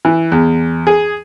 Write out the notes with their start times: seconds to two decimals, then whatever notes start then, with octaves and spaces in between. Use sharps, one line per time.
0.05 E3
0.32 E2
0.87 G#4